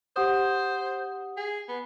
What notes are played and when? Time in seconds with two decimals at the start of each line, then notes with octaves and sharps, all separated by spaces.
0.16 G4 C5 F#5 D#6
1.37 G#4
1.68 B3